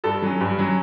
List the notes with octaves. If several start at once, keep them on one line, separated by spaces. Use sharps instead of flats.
G2 A4
F#3 C#4
G2
F#3 C#4